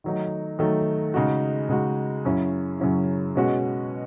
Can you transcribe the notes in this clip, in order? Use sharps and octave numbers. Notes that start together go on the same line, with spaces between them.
D#3 F#3 A3 D#4
D#3 F#3 A3 D#4
C#3 G#3 D#4 F#4
C#3 G#3 D#4 F#4
F#2 C#3 F#3 C#4 E4
F#2 C#3 F#3 C#4 E4
B2 G#3 C#4 F#4